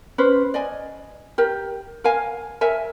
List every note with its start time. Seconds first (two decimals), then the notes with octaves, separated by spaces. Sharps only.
0.18 C#4 B4 C5
0.54 D5 D#5 G#5
1.38 G4 A#4
2.04 A#4 F5 G#5
2.61 A#4 C#5 E5 G#5